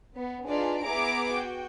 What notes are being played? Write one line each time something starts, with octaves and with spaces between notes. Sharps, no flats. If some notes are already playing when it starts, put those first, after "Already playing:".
B3
D4 D#4 F4 G#4 B4 D5
B3 E4 G#4 A#5 D6 D7
F#4 G5